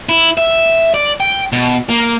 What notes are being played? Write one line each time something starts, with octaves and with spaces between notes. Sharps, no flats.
E4
E5
D5
G5
B2
A#3